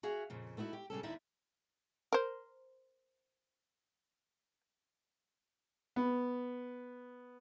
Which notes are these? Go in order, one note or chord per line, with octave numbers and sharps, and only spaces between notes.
F#4 G#4 E5 F5
F2 A#2 C#3
A3 B3 D#4 E4 F#4
G4
C#3 G3 C#4 A4
D#2 D#4 E4 D5 E5
A#4 C5
B3